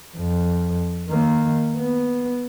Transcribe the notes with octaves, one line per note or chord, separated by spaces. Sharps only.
F2
D#3 A#3
B3